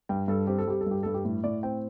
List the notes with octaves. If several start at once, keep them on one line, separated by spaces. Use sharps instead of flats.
G2 G5
G2 A4
C4 G4
A4
G3 G4
A4
G2 G4
G2 A4
G4
A2
A2 D5
C4 G5